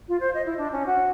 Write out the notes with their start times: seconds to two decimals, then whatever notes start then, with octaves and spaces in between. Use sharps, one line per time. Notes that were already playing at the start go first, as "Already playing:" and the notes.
0.08 F4
0.20 C5
0.34 D#5
0.46 E4
0.57 D4
0.72 C#4
0.86 F#4